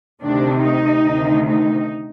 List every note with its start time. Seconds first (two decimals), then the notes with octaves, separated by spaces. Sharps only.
0.22 D2 C3 D#3 D4
0.63 D#4
1.05 D2 C3 D#3
1.47 D#4